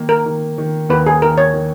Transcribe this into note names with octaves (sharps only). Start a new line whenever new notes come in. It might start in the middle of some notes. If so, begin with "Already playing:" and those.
Already playing: D#3 A#3
A#4
D#3
D#3
D#2 B4
G#4
D#3 A#4
C#5
D#3